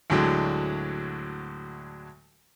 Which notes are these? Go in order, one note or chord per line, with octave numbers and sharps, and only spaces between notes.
D2 A2 D3 F#3 G#3